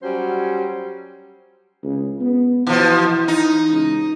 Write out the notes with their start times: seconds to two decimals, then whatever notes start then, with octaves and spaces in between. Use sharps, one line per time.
0.03 F#3 G3 C#4 C5
1.83 C#2
2.20 B3
2.67 B2 E3 F3
3.28 D#4
3.71 C#2